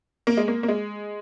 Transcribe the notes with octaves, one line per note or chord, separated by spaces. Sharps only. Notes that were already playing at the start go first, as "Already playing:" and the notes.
A#3
G#3
A#3
A#3
G#3